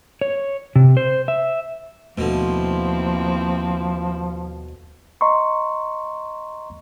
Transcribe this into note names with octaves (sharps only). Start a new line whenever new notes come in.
C#5
C3
C5
E5
D#2 B2 D3 F3 A3 A#3 C4 E4
D#5 A#5 C6 C#6